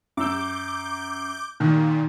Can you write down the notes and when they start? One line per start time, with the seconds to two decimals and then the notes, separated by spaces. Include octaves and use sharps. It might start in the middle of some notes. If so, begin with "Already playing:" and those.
0.17 F#2 D6 E6 G6
1.60 A#2 D#3